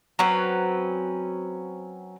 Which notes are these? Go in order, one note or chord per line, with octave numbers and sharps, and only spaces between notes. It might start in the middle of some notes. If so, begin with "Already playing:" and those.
F#3 C4 C#4 B4